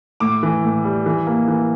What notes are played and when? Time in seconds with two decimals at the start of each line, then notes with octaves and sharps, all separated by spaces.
0.20 A2 D6
0.43 E3
0.64 A2
0.84 G3
1.06 E3
1.27 A#3
1.48 E3